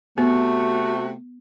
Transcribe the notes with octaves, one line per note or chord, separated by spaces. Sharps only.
C3 A3 B3 F#4